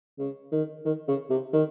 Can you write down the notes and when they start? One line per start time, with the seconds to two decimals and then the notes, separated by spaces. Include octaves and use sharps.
0.19 C#3
0.52 D#3
0.85 D#3
1.08 C#3
1.30 C3
1.53 D#3